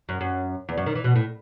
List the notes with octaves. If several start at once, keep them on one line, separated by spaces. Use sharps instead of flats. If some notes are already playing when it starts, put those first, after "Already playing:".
F#2
F#2
E2
F#2
D#3
E3
B2
A2